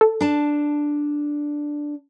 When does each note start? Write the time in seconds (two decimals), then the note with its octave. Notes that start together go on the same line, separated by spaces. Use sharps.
0.01 A4
0.21 D4 A5